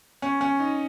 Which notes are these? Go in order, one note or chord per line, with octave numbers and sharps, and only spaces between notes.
C#4
C#4
D#4